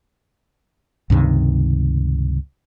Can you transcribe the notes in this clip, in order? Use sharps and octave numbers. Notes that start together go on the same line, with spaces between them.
C#2 G2 C3 D#3